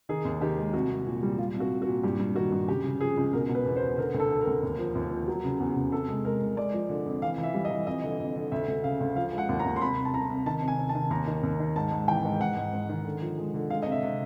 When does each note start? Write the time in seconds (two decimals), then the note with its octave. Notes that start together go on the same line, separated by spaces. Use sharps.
0.09 D#3 G#4
0.25 D#2
0.41 D#3 G4
0.58 G#3
0.74 C2 F#4
0.90 C2
1.07 A#2
1.23 G3
1.38 G3 F4
1.55 C2
1.60 F#4
1.71 C2
1.82 F#4
1.87 A#2
2.03 G2 G4
2.19 G2
2.36 D#3 F#4
2.52 G2
2.68 C#3 G4
2.84 C#3
3.00 F3 G#4
3.17 C#2
3.33 B2 A#4
3.49 B2
3.55 B4
3.66 E2
3.76 C5
3.82 B2
3.98 D3 A#4
4.14 D2
4.20 A4
4.30 D3
4.41 A#4
4.47 D2
4.63 D#2
4.79 F3
4.95 D#2
5.11 F3
5.28 F#3
5.44 C#3
5.60 E2
5.76 C#3
5.92 C3 A4
6.09 G#3
6.25 G#3 A#4
6.41 C2
6.57 G#3 D5
6.73 F3
6.89 D3
7.06 F2
7.22 E3 F5
7.38 E3
7.43 E5
7.54 G3
7.65 D#5
7.71 E3
7.87 F2 D#5
8.04 D3
8.19 F2
8.36 D3
8.52 D2 E5
8.68 D2
8.84 C#3 F5
9.00 D2
9.16 F3 F5
9.33 G#3
9.38 F#5
9.49 D#2
9.59 A#5
9.65 D#2
9.76 C6
9.81 C2 B5
9.97 C2
10.05 A5
10.14 C2 A#5
10.30 C2
10.46 D#3 A5
10.62 C3
10.68 G#5
10.78 C3
10.89 A5
10.95 D#3
11.10 D#2 A#5
11.27 D#3
11.43 D#2
11.60 D#3
11.76 G#2 A5
11.92 G#2
12.08 E3 G5
12.24 G#2
12.40 G#2 F#5
12.57 G#2
12.73 G#2
12.89 D#3
13.05 D3
13.22 F3
13.38 G#3
13.54 D3
13.70 G#3 F5
13.83 C3 D#5
13.92 E5
14.03 C3